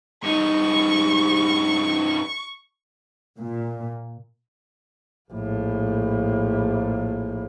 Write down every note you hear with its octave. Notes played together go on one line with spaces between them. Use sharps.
G2 D#4 C#6
A#2
A#1 A2